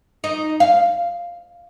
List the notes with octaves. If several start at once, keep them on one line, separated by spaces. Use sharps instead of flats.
D#4
F5